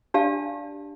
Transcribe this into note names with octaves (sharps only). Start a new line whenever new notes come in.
D4 G4 D5 F5 A5